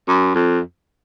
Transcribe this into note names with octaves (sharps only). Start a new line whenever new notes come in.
F#2
F2